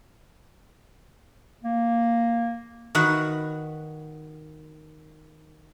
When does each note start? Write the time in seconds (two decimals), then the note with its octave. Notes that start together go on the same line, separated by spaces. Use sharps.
1.63 A#3
2.95 D#3 F#4 B4 F#5 B5